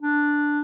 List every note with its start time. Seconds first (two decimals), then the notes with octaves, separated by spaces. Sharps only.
0.01 D4